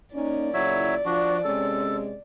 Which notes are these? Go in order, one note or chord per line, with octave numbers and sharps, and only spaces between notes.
A#3 C#4 D#4 D5
A#2 C#3 F#3 E4 C#5 E5
F3 D4 F#4
C3 G#3 C#4 A4